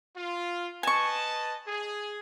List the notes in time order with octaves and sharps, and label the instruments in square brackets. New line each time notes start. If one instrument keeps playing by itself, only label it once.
[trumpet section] F4
[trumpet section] B4 D#5 A5 [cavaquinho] G#5 C#6
[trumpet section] G#4